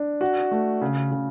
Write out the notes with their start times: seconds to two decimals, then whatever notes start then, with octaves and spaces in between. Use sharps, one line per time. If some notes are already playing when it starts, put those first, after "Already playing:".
Already playing: D4
0.21 F#4
0.51 A3
0.82 C#3
1.11 C#3